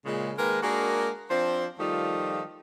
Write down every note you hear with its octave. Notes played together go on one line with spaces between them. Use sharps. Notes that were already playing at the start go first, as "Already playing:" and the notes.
A#2 C#3 G#3
D#3 G#3 A#3 A#4 B4
G#3 A#3 D4 F#4 G#4 A#4
F3 C4 D4 C5
D#3 F3 G3 A3 D#4 F4